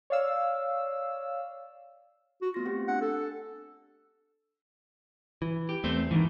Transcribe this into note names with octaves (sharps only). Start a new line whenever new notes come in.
C#5 D5 F5 E6
F#4
A3 B3 F4 A#6
C4 G4
D4 F#5
A4
E3
G4
E2 A3 C4 C5
D#2 G#2 D#3 E3